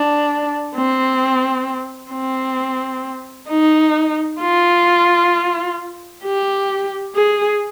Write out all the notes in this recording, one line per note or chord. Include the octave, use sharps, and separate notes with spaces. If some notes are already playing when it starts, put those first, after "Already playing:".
Already playing: D4
C4
C4
D#4
F4
G4
G#4